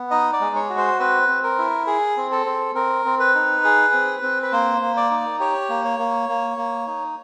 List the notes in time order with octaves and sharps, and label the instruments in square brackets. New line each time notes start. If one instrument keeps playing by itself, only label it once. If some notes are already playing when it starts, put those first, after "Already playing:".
Already playing: [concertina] B3
D#4 D#5
D5
G#3
C#5
F#4
C5
C4 B4
C4
A#4
E4
G#4
C4
A4
C4
C4 A#4
C4
B4
D#4
G#4
C4
C4
B4
A#3 C5
A#3
D5
D#4
G4 C#5
A#3
C#5
A#3
A#3
A#3
D#4